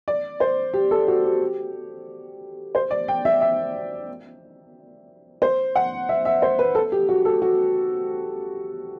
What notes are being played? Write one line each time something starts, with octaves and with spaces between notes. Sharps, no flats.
D5
C5
G4
A4
F#4
G4
C5
D5
G5
E5
E5
C5
F#5
E5
E5
C5
B4
A4
G4
F#4
A4
F#4